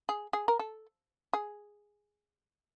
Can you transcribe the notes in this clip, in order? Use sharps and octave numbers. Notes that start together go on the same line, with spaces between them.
G#4
G#4
A#4
A4
G#4